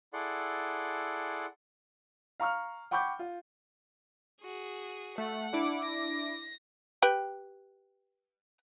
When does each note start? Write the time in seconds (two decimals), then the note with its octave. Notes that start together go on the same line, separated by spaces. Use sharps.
0.13 E4 G#4 A4 D5 F#5 C6
2.40 F5 A#5 C#6 F6
2.91 F#5 G5 B5 C#6 D6 G6
3.19 F4
4.42 F#4 G#4
5.18 A3 F#5
5.53 D4 E4 D6
5.85 A#6
7.02 G4 B4 G5